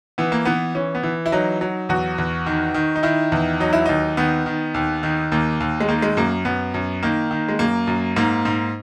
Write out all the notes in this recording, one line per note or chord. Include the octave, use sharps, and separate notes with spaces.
E3 B3
A#3
E3 B3
E3 C#4
B3
E3
E4
F#3 D#4
F#3
E2 F#4
E2
D#3
D#3
D#4
D#3 E4
E2
F#3 D#4
E4
D#2 D#4
D#3 B3
D#3
D#2
D#3
D#2 A#3
D#2
G#3
D#3 A#3
G#3
F#2 A#3
F#2 B3
F#2
D#3 A#3
D#3
G#3
F#2 A#3
F#2
G#2 A#3
G#2